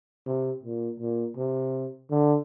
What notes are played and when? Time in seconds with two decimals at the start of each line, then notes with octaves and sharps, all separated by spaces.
0.27 C3
0.64 A#2
1.00 A#2
1.37 C3
2.10 D3